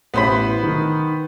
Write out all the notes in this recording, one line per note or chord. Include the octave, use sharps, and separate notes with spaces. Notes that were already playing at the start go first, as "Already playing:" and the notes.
A1 B3 E4 C5 B5 B6
D#3